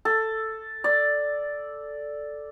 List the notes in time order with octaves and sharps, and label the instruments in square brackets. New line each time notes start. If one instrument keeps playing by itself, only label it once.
[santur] A4
D5